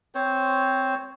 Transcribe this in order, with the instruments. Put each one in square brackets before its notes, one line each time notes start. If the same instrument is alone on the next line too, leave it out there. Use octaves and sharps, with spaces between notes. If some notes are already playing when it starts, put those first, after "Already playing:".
[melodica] C4 C5 C#5